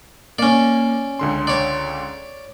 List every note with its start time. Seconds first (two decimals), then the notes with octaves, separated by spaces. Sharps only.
0.39 A#3 C#4 D5
1.19 C#2 D3 C6
1.47 C#5 D5